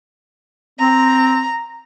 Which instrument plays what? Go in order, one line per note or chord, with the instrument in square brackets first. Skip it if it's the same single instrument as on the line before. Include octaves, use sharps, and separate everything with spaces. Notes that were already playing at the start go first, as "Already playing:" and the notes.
[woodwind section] C4 [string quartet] A#5